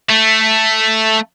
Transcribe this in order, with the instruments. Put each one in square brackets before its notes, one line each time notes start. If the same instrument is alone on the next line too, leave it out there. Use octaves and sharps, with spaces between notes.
[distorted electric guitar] A3